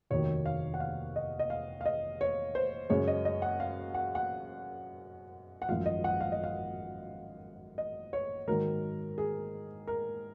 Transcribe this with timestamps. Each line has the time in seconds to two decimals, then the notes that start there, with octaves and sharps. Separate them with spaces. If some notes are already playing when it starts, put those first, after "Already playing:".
0.10 F1 D#2 D#3 F#3 A#3 C#5
0.46 F5
0.74 F#5
0.80 F5
1.16 D#5
1.39 D#5
1.50 F5
1.81 F5
1.86 D#5
2.21 C#5
2.55 C5
2.90 F#2 C#3 G#3 C#5
3.08 D#5
3.25 D#5
3.42 F#5
3.60 F5
3.94 F#5
4.15 F#5
5.62 F#5
5.69 G#1 F#2 F3 F5
5.86 D#5
6.04 F#5
6.21 F5
6.32 D#5
6.44 F5
7.78 D#5
8.13 C#5
8.48 G#2 D#3 F#3 A#4
9.18 G#4
9.87 A#4